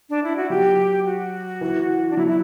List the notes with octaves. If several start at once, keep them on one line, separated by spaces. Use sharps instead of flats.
D4
E4
F#4
F#3 G4
F#4
E3
D4
F#3 E4
E4